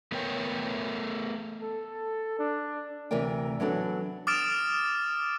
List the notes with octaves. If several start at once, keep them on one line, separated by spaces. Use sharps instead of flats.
A3 B3 A4 A#4 C#5 G5
A4
D4
D2 C3 E3 A#4 D5 G5
E3 F#3 B3 D4 A4
D6 D#6 F6 A6 D7 E7